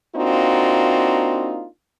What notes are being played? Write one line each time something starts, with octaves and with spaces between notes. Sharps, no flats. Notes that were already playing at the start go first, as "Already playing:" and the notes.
A#3 C4 D4 D#4 F4 F#4